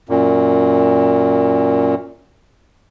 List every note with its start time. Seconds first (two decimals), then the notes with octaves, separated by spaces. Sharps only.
0.09 F#2 A#2